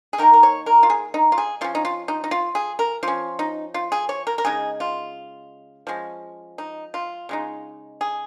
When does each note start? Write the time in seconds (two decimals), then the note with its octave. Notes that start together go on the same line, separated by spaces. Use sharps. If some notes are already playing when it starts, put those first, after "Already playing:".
0.13 G#4
0.18 D#3 A#3 D#4 A#4
0.33 A#4
0.43 C#5
0.66 A#4
0.83 F4
0.90 G#4
1.14 D#4
1.32 F4
1.38 G#4
1.61 F3 C#4 F4
1.75 D#4
1.85 F4
2.08 D#4
2.24 D#4
2.31 F4
2.55 G#4
2.79 A#4
3.03 F3 C#4 F4
3.39 D#4
3.74 F4
3.92 G#4
4.09 C#5
4.27 A#4
4.38 A#4
4.45 C#3 G#3 D#4 G#4
4.80 F4
5.87 F3 G#3 C#4
6.58 D#4
6.94 F4
7.29 C#3 G#3 D#4
8.01 G#4